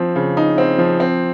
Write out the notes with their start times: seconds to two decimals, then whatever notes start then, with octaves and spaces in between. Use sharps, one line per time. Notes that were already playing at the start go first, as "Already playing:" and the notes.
Already playing: F3 C4
0.15 C#3
0.37 D#4
0.58 C4
0.78 F3
1.00 C4